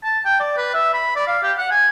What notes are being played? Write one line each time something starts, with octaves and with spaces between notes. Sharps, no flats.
A5
G5
D5
B4
E5
B5
D5
F5
G4
F#5
G#5